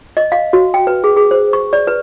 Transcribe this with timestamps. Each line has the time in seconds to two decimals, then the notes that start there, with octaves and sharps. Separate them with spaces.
0.17 D#5
0.32 F5
0.53 F#4
0.74 G5
0.87 B4
1.04 G#4
1.16 G#4
1.31 C5
1.53 C#6
1.73 D5
1.87 B4